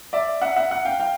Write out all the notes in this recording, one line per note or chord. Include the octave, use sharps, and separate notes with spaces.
D5 E5
E5 F#5
E5 F#5
E5 F#5
F5 G5
F5 G5